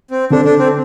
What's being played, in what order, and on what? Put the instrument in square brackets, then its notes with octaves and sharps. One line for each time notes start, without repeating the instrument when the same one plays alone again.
[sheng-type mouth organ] C4
[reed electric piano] D3 C4 A4 [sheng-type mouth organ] D4
[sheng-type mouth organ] D4
C4